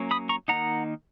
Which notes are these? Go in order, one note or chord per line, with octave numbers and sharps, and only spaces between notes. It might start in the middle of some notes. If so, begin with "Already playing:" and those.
Already playing: F#3 A#3 C#4
B5 D#6
A#5 C#6
D#3 A#3 D#4 F#5 A#5